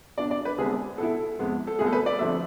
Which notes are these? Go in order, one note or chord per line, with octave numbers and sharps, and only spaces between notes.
B2 B3 D4 D5
D5
B4
C2 C3 G#3 B3 G#4
B2 B3 E4 A4
F2 C3 G#3 B3
A4
C2 B2 A3 G#4
A4
B4
D5
D2 C3 F3 A3 E5